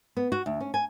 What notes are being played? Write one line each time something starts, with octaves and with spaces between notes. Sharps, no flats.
B3
F#4
D2
C#4
G#5